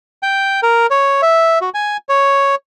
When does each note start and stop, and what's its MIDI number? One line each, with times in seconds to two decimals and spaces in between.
0.23 0.60 79
0.63 0.87 70
0.91 1.21 73
1.22 1.59 76
1.61 1.70 66
1.74 1.97 80
2.09 2.55 73